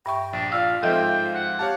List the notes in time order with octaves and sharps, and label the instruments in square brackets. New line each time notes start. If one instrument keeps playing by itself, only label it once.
[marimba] G2 E5 C#6 [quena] G5
[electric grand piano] A#1 [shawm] D4
[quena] F4 [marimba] D5 E6 [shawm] F5
[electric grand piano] G#2 F3 C4 [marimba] A4 D#5 E5 [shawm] G5
[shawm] F#5
[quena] G4 [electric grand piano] C#5 F5 A5